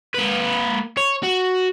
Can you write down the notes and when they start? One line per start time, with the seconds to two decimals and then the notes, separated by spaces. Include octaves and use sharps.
0.14 A#3 B4
0.97 C#5
1.23 F#4